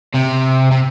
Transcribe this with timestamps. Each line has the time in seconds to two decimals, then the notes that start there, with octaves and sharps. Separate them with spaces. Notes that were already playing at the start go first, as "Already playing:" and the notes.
0.14 C3
0.71 C3